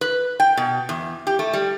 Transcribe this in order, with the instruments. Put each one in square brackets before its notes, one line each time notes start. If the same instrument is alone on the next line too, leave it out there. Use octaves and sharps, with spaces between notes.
[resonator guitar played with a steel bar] B4
G5
B2
E2
G4
A3
G3